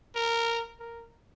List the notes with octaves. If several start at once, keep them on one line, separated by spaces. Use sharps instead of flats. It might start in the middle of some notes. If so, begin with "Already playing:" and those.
A#4
A#4